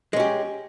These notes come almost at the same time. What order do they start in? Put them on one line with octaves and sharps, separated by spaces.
G#3 C#4 G4